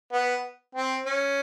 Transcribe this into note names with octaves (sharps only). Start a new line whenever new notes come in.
B3
C4
C#4